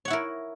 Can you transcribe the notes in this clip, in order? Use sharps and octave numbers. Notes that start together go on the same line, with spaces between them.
E4 A#4 C#5 F#5